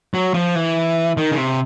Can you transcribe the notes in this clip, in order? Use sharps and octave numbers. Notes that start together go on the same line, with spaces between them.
F#3
F3
E3
D#3
C#3
C3